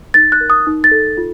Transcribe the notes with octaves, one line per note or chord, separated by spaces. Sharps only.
D#4 A6
F#6
A#4
D#6
D#4
A6
A4
F4